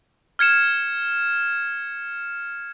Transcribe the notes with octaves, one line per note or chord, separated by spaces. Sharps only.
F6 G#6 C#7 E7